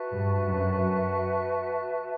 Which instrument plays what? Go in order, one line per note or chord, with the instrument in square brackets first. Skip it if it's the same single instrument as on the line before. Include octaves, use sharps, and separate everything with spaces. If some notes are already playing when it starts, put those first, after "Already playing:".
Already playing: [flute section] F#4 B4 E5 A5
[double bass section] G2
F#2